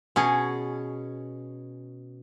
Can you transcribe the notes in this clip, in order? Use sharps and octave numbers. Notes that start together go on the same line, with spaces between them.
B2 C#4 G#4